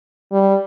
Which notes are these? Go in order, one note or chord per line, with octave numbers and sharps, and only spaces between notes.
G3